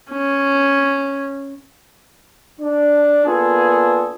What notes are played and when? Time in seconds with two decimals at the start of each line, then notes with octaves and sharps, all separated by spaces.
0.11 C#4
2.61 D4
3.26 A#3 B3 D4 F4 G#4 A4